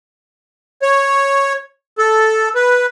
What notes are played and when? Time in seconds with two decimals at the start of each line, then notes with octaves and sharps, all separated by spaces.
0.82 C#5
1.98 A4
2.55 B4